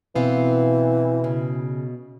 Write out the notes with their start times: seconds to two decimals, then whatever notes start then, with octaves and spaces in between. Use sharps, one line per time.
0.15 B2 E3 B3 C4 F5
1.24 C#3